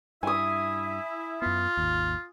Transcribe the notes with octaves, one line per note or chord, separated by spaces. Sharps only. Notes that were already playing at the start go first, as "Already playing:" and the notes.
G2 E4 E5 G#5 D#6
F#2 B3 F4
G#1 D#2